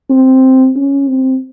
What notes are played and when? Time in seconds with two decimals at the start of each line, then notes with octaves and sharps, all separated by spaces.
0.10 C4
0.76 C#4
1.08 C4